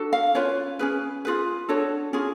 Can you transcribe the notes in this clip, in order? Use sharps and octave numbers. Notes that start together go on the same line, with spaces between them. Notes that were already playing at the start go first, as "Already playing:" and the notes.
Already playing: D4 F#4 A4
F5
C#4 F4 B4 C#5
C#4 G#4 B4
F4 G#4 B4
D4 F#4 A4 C#5
C#4 F4 G#4